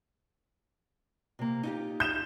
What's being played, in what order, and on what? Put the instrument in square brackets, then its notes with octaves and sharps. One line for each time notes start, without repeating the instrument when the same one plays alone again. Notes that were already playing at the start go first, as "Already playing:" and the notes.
[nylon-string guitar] C3 A#3
D#4 F4 G4
[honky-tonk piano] G6 E7